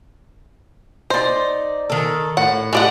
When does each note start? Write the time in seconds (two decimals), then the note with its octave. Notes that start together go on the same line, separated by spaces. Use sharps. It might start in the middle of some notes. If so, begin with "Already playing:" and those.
1.10 D#4 C5 D5
1.90 D#3 A4
2.37 A2 F#5
2.73 A2 G#3 G4 D5 F#5